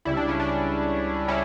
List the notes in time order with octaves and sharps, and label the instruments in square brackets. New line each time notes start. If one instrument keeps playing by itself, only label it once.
[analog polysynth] C#2 C#3 G3 E4
D4
C#4
D4
C#4 E4